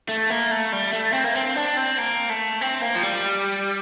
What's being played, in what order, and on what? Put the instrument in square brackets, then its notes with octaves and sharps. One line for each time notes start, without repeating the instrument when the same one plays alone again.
[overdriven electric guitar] A3
A#3
A3
G3
A3
C4
A#3
C4
D4
C4
A#3
A3
C4
A#3
F3
G3